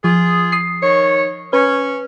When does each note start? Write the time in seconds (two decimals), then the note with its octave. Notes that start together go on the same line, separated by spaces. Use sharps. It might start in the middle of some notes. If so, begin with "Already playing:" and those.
0.04 F3 F4 G#4
0.52 D#6 C7
0.83 D#3 C#5
1.53 C#4 B4